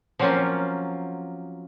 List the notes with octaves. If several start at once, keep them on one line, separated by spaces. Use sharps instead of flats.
F3 F#3 A#3 C4 C#4 F4